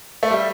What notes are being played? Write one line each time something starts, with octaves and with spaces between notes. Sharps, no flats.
A3
G3